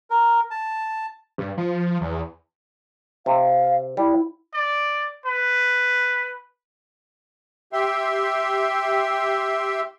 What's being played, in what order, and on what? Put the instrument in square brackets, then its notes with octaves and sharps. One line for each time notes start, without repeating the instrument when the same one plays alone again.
[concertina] A#4
A5
[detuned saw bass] G2
F3
E2
[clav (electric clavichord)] C3 [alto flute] F5
[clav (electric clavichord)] G3 [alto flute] E4
[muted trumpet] D5
B4
[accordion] G4 E5 G5 C6